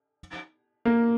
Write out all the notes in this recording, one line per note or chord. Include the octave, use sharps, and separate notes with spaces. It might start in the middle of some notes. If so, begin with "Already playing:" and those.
A#3